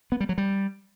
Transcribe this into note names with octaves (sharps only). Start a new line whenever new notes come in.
B3
G3
F#3
G3